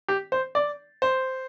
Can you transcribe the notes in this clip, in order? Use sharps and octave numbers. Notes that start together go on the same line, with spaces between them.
G4
C5
D5
C5